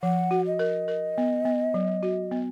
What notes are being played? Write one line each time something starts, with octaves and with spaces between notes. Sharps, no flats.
F3 F#5
F#4
D#5
A#4
A#4
B3
B3
F#3
F#4
B3